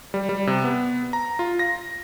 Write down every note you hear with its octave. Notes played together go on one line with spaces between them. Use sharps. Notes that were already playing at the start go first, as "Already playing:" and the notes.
G3
G3
C3
B3
A#5
F4
A#6